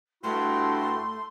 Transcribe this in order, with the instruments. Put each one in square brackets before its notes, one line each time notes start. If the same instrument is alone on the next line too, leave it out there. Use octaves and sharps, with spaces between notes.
[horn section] G2 [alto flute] A3 [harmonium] E4 F#4 [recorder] C6